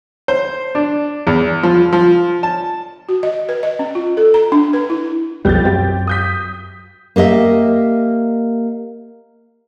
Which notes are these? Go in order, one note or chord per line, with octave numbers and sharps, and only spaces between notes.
C5
D4
E2
F3
F3
A5
F#4
D#5
B4
D#5
C#4
F4
A4
A#5
D4
B4
E4
B1 F2 B2 G3 G6 A6
F#2 C4 G4
D#6 G6 B6
A#3 G4 D#5 E5